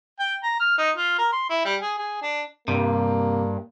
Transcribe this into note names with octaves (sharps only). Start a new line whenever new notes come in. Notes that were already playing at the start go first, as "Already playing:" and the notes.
G5
A#5
F6
D#4
F4
A#4
C6
E4
G3
G#4
G#4
D4
G2 C3 A#3